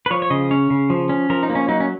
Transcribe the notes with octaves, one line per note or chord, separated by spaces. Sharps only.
B4
F3 C#5
C#5
C#3 D#5
C#4 C#5
C#3
F3
C#4
F3 A#4
D#4
A#3
C#4
F#3 D#4
C#4